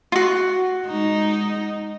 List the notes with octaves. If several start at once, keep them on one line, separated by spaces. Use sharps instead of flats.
F4 F#4
G#3 D#4